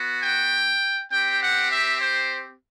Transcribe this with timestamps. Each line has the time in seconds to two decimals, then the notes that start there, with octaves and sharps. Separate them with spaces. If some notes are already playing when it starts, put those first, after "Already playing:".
Already playing: B3 F#4
0.21 G5
1.11 C4 G4 G5
1.40 F#5
1.70 E5
2.01 C5